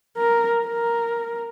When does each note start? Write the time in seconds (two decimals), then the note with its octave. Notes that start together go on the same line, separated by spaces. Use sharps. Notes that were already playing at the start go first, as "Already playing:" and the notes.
0.17 A#4
0.67 A#4